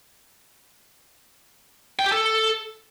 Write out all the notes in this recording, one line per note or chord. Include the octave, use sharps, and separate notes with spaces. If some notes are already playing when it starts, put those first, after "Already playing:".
G5
G4
A4